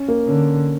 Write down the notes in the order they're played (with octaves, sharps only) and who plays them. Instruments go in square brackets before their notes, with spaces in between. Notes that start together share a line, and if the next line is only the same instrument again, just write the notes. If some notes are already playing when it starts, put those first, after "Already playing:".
Already playing: [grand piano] C#4
A#3
[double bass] D3 [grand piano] C#4